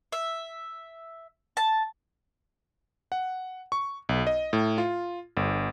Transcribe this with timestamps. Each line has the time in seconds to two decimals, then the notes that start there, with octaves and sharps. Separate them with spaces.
0.12 E5
1.57 A5
3.12 F#5
3.72 C#6
4.09 B1
4.27 D#5
4.53 A2
4.78 F4
5.37 G1